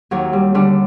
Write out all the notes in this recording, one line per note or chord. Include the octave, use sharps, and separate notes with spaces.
D#2 F#3
G3
D3 G3